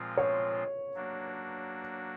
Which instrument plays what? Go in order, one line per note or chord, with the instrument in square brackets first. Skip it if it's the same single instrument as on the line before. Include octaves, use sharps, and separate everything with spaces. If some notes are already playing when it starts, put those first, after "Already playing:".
Already playing: [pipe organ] A#2 F3 G#3 C4 F4
[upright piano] C#5
[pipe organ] F#3 A#3 D4 F#4